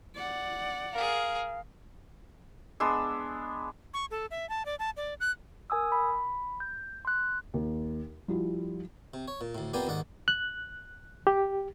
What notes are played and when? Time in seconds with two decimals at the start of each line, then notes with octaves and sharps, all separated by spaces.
0.16 D5 F#5
0.93 G#4 A#4 F5
2.80 G#3 B3 D4 E6
3.94 C#6
4.11 A4
4.31 E5
4.49 A5
4.66 D5
4.79 A5
4.97 D5
5.20 F#6
5.70 A#4 G#5 D#6 E6
5.92 B5
6.60 G6
7.05 C6 F#6
7.54 D#2
8.28 F3 G3 E4 F#4
9.14 C3
9.28 C#5
9.41 A#2
9.55 D2 A2
9.73 F2 A#3 B3 G4 D5 G#5
9.87 D#2 G#2 D5 F#5
10.28 F#6
11.27 G4